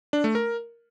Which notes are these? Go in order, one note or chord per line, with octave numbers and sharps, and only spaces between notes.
D4
A3
A#4